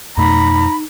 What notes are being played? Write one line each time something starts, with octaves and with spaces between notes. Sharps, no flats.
F2 B2 A3 D#4 A#5 B5